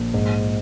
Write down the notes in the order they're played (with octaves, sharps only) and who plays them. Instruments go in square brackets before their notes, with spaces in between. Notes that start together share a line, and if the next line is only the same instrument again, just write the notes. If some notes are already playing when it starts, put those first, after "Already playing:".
Already playing: [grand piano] A#1
G#2